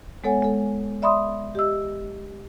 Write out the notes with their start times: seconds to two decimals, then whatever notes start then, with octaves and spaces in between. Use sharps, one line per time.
0.24 G#3 B3 A4 C#5 F#5 G#5
0.43 G#3 A4
1.02 D5 E5 B5 C6 D#6
1.55 G4 D#5 E6